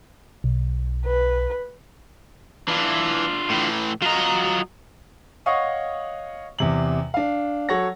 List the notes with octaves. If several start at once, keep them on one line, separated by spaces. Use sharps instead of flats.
B1
B4
E3 D4 F4
A2 E3
F#3 F4 D#5 A#5
C#5 D#5 F5 F#5 C#6 D#6
E2 C3 F#7
D4 F5
F#3 A4 C#5 F#5 A#6